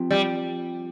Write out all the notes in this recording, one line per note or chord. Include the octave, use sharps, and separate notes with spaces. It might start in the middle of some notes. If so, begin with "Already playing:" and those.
Already playing: F3 C4 G4
G3